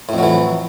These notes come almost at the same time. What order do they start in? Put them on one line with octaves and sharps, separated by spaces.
A2 F2 F#3 E3